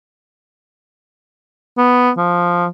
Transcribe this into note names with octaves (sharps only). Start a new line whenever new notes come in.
B3
F3